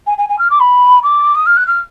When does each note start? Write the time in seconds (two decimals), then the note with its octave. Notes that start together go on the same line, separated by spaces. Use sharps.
0.06 G#5
0.18 G#5
0.29 G#5
0.38 F6
0.50 D6
0.60 B5
1.03 D6
1.35 D#6
1.46 F6
1.57 F#6
1.67 F6